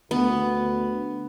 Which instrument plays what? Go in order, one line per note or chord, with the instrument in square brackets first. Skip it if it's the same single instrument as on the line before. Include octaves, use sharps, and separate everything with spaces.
[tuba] D2 [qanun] B3